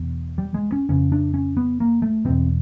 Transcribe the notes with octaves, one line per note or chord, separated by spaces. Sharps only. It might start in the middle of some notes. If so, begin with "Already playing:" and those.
Already playing: E2 B2
G3
G#3
C#4
F2 C#3 C#4
D4
C#4
B3
A#3
A3
E2 B2 C4